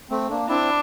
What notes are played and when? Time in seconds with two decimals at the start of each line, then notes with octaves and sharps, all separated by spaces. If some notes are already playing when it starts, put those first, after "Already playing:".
0.10 A3 C4
0.29 A#3 D4
0.48 C4 D4 E4